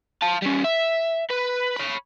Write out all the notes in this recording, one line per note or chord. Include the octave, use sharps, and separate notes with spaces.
F5 A5
G3 C#4
E5
B4
C#5 B5